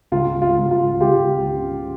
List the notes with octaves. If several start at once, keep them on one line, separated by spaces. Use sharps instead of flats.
C#2 F4
F4
C#2
F4
C#2 F4 G4
C#3